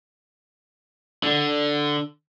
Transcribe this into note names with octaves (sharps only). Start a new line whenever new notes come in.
D3